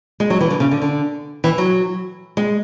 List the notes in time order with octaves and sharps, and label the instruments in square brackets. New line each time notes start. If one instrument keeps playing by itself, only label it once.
[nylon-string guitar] G#3
F#3
E3
D3
C#3
D3
D3
E3
F#3
G#3